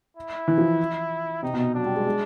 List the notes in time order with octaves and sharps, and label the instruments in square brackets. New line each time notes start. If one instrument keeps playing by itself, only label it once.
[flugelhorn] E4
[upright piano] E3
F3
[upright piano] C3 [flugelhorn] D#4
[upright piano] B2
[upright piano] F#3 [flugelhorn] D4
[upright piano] G3
G#3
G#3